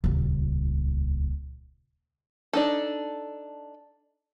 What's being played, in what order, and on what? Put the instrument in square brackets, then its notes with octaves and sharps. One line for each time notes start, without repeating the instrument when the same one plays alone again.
[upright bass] D#1 C#2
[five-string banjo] D4 D#4 A4